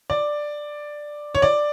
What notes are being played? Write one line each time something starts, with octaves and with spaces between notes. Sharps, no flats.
D5
C#5
D5